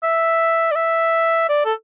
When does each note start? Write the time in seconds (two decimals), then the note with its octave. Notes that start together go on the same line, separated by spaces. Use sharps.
0.03 E5
0.71 D5
0.75 E5
1.49 D5
1.65 A4